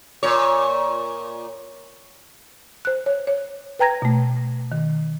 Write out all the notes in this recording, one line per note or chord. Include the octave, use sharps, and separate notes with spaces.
A#2 C#5
C5 F#6
C#5
C#5
B4 G5 A#5 G#6 A#6
B2 A3
D#3